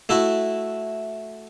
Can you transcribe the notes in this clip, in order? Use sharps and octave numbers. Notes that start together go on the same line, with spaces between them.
A3 E4 F#4